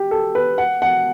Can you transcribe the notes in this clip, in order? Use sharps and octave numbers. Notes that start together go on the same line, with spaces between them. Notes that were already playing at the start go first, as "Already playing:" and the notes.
Already playing: G4
A4
B4
F#5
F#5